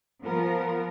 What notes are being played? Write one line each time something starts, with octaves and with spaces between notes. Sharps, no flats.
F3 B3 A#4